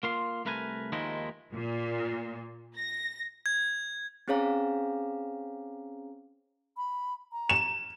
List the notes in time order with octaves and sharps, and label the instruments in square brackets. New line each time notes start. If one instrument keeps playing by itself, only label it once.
[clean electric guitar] A#3 F4 C6
C2 A3 A#4 B4 D#5 G#5
D#2 D#3 F3 G#3 D#4 E4
[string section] A#2
A#6
[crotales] G#6
[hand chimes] C4 C#4 G#4 C#5 F5 A#5
[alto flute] B5
A#5
[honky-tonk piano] E7